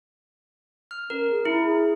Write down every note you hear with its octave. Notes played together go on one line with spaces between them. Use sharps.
F6
C#4 A#4
G#4
E4 A#5
G#4